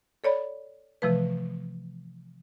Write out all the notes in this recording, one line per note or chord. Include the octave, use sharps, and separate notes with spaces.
A4 C#5 D5 B5
C3 E3 F3 A3 B4